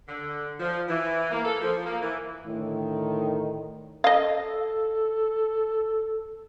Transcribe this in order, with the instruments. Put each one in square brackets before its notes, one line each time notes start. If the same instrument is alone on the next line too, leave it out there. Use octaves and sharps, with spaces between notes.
[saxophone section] D3
F3
E3
A#3
A4
F3
A#3
E3
[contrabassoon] A2 [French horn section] D3 D#3
[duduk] A4 [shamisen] D#5 F5